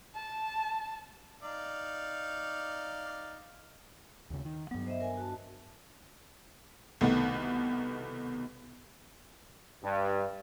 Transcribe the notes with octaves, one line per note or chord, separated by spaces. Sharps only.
A5
D#4 D5 F5
D#2 C#3
D#3
G2 F#3 B3
C5 D#5 E5
A#4 G#5
F#4 A5
C2 B2 D#3 A3 B3
G2